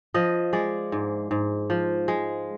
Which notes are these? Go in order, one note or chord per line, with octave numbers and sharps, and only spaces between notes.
F3 D#5
G#3 D5
G#2
G#2
F3
G#3